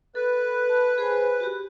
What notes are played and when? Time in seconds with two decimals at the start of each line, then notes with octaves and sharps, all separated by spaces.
0.15 A4 B4
0.69 A5
0.98 G#4 C5 G#5
1.40 F#4 G4